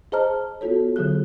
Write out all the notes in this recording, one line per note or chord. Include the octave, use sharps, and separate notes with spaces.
G#4 C5 D#5 A5 A#5 F6
B3 F4 F#4 A4 C#5
D3 F#3 F4 G#4 F#6